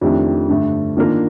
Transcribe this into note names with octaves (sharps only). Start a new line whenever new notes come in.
F2 D#3 A3 D4 G4
G2 D3 A3
D#3 A#3 D4 F4 A#4